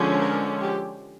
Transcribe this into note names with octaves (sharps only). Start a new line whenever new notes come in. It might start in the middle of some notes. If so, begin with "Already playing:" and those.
Already playing: D3 F3 G#3 C#4
A#4
G4